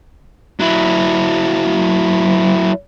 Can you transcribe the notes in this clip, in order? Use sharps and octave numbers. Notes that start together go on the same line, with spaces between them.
F#3 E4